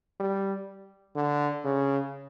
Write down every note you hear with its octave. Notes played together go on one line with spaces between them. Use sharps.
G3
D3
C#3